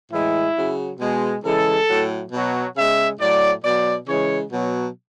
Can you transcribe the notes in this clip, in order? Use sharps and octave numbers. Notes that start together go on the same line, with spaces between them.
A2 E3 G#3 E4
C#3 F#3
B2 G#3
C#3 E3 G#3 A4
A2 F#3
B2 F#3
C#3 G#3 E5
A2 F#3 D5
B2 F#3 D5
C#3 E3 G#3 C#5
B2 F#3